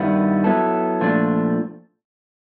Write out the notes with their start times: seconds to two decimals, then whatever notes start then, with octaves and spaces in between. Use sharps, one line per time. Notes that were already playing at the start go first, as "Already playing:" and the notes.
Already playing: G2 D#3 G3 B3 E4
0.44 F#3 B3 E4 A4
1.01 A#2 F3 A3 D4